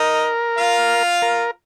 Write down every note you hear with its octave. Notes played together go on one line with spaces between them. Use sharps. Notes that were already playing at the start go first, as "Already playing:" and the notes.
Already playing: D#4 A#4 D#5
F4 F5
A#4